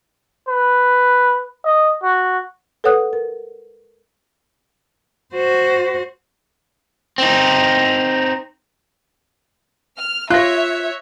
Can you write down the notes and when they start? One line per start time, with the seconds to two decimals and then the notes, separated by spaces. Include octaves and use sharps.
0.48 B4
1.65 D#5
2.03 F#4
2.84 A4 B4 C#5 F#5 D#6 F#6
3.13 A#4
5.34 F#4 C5
7.18 C4 D#4
9.98 F6
10.30 F4 C#5 E5 F#6 A#6